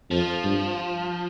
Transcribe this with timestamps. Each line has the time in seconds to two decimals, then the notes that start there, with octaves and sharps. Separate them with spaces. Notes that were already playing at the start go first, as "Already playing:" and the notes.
0.11 F2 F3
0.44 G2